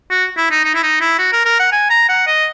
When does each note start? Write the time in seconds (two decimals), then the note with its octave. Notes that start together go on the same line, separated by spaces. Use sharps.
0.11 F#4
0.37 E4
0.51 D#4
0.65 D#4
0.75 E4
0.83 D#4
1.01 E4
1.19 F#4
1.32 A#4
1.45 A#4
1.59 F#5
1.72 G#5
1.90 A#5
2.09 F#5
2.27 D#5